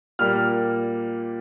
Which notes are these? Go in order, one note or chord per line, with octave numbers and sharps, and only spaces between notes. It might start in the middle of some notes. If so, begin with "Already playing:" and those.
A#2 G3 A#3 F6